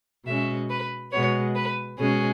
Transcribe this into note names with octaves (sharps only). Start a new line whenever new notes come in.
B2 G#3 C#4 E5
B4
B2 G#3 B3 C#5
B4
B2 G#3 C#4 G#4